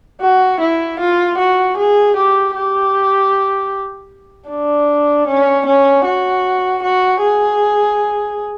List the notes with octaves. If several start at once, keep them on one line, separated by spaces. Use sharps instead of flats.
F#4
E4
F4
F#4
G#4
G4
G4
D4
C#4
C#4
F#4
F#4
G#4